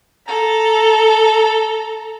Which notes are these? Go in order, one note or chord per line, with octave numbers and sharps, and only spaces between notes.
A4 A#5